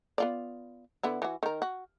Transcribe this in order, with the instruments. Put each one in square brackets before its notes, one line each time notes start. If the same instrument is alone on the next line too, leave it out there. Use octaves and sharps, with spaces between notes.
[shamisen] B3 F4 D5
D3 B3 E4
E3 F#4
D#3 A#4
F#4